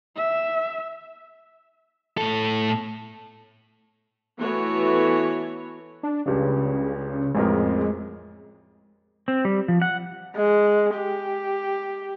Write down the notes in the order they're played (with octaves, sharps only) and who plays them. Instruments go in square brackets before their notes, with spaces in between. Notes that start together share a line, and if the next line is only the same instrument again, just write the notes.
[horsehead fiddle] E5
[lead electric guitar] A2 A4
[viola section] E3 A3 B3 F#4 C#5
[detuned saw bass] D4
[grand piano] C#2 G3 D4 [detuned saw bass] C#3
[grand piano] A1 F2 A#4 [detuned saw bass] G#3
[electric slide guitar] C4
G3
F3
F#5
[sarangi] G#3
G4